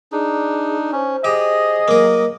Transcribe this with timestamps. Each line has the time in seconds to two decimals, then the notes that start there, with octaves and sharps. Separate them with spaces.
0.12 D4 D#4 G#4
0.92 C#4 C5
1.24 G4 G#4 D#5
1.88 F#3 A#3 A#4